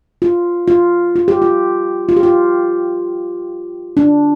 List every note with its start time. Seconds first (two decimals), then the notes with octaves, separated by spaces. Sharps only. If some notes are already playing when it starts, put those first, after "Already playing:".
0.22 F4
0.68 F4
1.16 F4
1.28 G4
1.42 F4
2.09 F4
2.17 G4
2.23 F4
3.97 D4